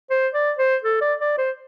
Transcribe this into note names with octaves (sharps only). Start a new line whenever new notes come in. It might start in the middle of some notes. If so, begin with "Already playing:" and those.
C5
D5
C5
A4
D5
D5
C5